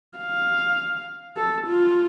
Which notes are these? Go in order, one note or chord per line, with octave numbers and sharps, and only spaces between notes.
F5
A4
F4